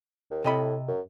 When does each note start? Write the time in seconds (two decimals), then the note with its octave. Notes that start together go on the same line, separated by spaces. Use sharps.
0.31 D#2
0.44 A2 C3 D#5 B5
0.88 F#2